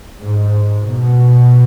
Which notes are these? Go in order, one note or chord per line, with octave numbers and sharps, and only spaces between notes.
G#2
B2